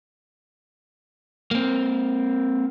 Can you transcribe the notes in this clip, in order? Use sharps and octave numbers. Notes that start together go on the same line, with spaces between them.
A#3 C4